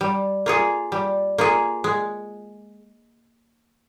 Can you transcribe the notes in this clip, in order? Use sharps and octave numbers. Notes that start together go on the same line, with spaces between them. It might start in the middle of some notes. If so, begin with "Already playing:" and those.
G3
A#3 F4 G#4
G3
A#3 F4 G#4
G#3